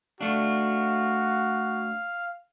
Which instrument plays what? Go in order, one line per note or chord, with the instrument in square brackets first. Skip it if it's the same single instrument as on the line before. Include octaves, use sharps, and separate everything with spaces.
[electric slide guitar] A3 D4 [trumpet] F#4 [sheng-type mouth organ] F5